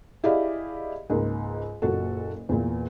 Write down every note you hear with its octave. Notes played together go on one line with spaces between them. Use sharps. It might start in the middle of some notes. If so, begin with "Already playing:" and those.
E4 G4 G#4 D5 D#5 F5
C#2 G#2 A#3
F#1 A#2 F#4 A4
E2 A#2